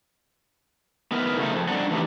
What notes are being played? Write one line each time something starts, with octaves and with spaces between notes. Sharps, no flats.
B3 D#4 E4 A#4 B4
C#3 F#3 A3 D#4 A4
F2
G3 D4 D#4 D5 F#5
E3 A3 D#4 G4